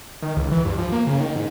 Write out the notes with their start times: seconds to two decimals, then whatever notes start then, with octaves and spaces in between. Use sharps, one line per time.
0.22 D#3
0.37 C#2
0.52 E3
0.65 G2
0.78 F3
0.92 A#3
1.07 C#3
1.20 D#3
1.36 G#2